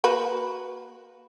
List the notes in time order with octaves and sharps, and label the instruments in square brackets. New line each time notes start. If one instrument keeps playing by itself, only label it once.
[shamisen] A#3 F#4 B4